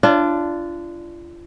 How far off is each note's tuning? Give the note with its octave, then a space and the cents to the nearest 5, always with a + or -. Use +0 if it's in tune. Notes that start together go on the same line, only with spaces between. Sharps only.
D4 +0 F4 -30